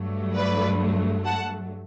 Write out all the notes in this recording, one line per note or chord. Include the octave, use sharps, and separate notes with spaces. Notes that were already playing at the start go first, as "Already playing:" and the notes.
Already playing: G2 F#3 A3
B4 D5
F#5 A5